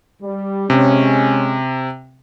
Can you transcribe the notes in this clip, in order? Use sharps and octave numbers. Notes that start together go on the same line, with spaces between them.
G3
C3 G#3 C#4